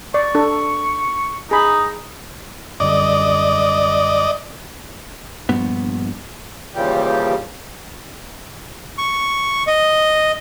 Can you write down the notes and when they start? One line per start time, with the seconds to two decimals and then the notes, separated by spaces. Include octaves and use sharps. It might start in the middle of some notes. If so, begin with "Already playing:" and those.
0.14 D5 C#6
0.35 D4 A4
1.51 D#4 G#4 B5
2.80 F#2 D3 G3 D5 D#5
5.49 A#1 G2 B3
6.74 D#2 C#3 E3 F3 G3 G4
8.98 C#6
9.67 D#5